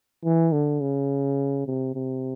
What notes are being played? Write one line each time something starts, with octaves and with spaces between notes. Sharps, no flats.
E3
D3
C#3
C3
C3